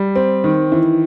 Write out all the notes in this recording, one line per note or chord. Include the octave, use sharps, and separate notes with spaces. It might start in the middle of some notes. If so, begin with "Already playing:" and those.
Already playing: G3
C4
D#3
E3